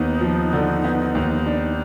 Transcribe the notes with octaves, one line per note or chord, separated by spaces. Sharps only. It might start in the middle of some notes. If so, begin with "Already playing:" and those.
Already playing: D#2 B3 D#4
F3
D3
B3
D#2
D4